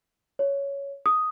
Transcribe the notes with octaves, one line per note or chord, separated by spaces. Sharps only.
C#5
D#6